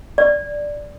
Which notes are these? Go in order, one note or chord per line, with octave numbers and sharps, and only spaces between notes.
D5